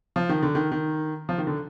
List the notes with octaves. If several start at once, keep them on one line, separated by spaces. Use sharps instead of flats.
F3
D#3
D3
D#3
D#3
F3
D#3
D3